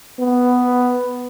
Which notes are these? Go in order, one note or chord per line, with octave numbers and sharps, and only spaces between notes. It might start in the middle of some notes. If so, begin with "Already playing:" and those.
B3